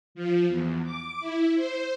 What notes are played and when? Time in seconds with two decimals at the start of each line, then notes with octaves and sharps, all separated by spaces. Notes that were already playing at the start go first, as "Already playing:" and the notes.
0.15 F3
0.48 E2
0.84 D6
1.20 E4
1.55 C5